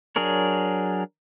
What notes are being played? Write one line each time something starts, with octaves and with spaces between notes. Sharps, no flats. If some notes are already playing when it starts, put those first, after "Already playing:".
F#3 D4 G#4 A#4 C#5